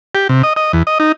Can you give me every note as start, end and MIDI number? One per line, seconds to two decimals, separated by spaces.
0.15 0.28 67
0.29 0.42 48
0.43 0.53 75
0.56 0.72 75
0.73 0.83 40
0.87 0.98 75
1.00 1.12 63